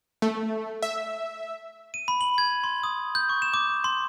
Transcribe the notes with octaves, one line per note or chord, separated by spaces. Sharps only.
A3
E5
D#7
B5
F#7
G#6
C6
D#6
G6
C#6
E7
D6
C6